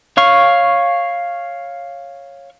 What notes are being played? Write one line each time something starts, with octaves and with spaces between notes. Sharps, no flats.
C#5 F5 C#6